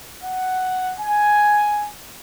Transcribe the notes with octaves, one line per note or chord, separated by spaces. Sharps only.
F#5
G#5